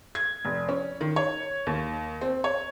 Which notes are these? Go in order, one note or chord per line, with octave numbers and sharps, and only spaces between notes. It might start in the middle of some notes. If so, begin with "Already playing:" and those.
G#6
F1
C#4
D#3
C#5
D#2
C4
C#5